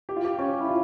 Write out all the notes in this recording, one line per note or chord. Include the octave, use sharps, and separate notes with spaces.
G4
F4
G4
C#4
E4
F4